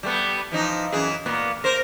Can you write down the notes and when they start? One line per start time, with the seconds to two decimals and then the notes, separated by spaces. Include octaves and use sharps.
0.03 G3 A3 B3
0.52 E3 F3 D#4
0.92 F#2 E3 G#4
1.26 A#2 A#3 B3
1.64 A#4 C5